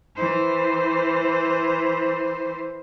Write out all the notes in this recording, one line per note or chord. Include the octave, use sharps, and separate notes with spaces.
E3 C5